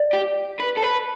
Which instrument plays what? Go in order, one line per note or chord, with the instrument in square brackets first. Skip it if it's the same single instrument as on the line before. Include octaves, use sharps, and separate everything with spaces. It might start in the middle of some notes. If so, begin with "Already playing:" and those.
Already playing: [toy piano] D5
[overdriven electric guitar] G4
B4
A4
B4